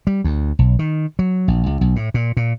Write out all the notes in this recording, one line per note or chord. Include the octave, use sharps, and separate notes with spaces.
G3
D2
B1
D#3
F#3
A#1
C#2
B1
A2
A#2
A#2